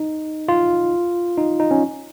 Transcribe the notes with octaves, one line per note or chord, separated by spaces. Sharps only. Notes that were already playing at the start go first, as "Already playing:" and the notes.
Already playing: D#4
F4
D#4
D#4
C#4